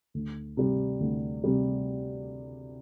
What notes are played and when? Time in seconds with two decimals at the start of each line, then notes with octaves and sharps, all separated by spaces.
0.14 D2
0.57 C3 G3
1.00 D2
1.44 C3 G3